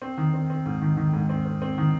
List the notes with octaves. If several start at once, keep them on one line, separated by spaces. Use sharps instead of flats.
C4
D#3
C4
C4
G#2
D#3
D#3
G#2
C4
C4
C4
D#3